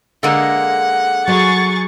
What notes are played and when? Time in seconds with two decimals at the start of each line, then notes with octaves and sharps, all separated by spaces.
0.23 D3 G#3 A#3 F#5
1.28 F#3 G#4 C#6 A6